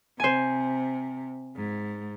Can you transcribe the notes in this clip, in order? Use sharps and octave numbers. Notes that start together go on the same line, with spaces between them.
C3 C5 G#5
G#2